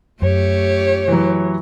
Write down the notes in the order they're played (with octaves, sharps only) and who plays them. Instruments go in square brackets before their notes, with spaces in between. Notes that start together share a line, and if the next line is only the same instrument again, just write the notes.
[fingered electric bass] F#2 [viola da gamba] A3 G4 [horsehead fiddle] C#5
[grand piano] E3 F#3